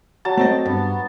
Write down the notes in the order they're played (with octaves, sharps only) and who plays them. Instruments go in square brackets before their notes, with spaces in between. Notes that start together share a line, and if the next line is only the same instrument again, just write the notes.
[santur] F#3 A5
[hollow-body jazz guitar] A3 C4 D#5
[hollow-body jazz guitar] G2 [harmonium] B3